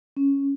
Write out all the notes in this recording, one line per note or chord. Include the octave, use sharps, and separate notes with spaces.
C#4